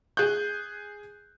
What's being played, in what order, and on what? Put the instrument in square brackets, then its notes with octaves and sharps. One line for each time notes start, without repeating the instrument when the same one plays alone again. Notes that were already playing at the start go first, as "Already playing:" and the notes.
[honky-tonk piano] G#4 F#6 G6